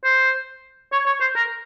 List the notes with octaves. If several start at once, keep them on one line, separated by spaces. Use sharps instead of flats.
C5
C#5
C#5
C5
A#4